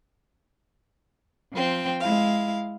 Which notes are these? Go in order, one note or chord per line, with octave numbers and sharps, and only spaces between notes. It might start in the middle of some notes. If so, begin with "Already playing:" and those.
F3 C4 G5
G#3 E4 F5